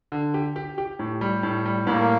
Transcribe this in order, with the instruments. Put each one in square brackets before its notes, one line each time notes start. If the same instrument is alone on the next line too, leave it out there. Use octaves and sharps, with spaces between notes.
[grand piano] D3
G4
G4
G4
A2
G3
A2
G3
[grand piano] A2 [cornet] A#3